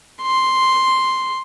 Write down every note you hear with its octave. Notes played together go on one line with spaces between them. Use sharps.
C6